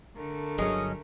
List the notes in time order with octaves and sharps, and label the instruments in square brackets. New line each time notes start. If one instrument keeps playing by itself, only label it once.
[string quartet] D3 A3 A#4
[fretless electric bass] G1 F#3 [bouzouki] G#3 C#4 [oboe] D#5